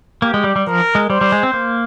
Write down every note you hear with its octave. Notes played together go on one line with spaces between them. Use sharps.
A#3 G4
G#3
G3
G3
F3 A#4
G#3
G3 C5
G3
G#3
C4
A#3